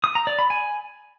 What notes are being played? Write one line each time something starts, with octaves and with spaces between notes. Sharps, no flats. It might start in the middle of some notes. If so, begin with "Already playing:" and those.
D#6
A#5
D5
B5
G#5